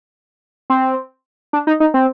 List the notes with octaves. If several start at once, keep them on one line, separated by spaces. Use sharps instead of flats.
C4
D4
D#4
D#4
C4